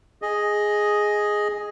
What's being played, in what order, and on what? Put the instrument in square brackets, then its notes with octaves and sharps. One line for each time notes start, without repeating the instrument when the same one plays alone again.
[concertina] G#4 D#5